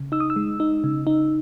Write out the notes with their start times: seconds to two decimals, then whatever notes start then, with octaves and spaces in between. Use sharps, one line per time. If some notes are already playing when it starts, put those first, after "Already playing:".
Already playing: C#3
0.12 D#4 E6
0.20 D#6
0.30 E6
0.36 G#3
0.60 D#4
0.84 C#3
1.07 D#4